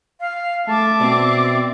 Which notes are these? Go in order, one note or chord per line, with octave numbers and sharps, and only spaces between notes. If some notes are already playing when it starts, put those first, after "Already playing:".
F5
A3 E5 A5 D6
B2 C4 D5